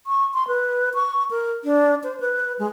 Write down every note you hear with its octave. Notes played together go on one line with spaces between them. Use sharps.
C#6
C6
B4
C#6
A#4
D4
C5
B4
G#3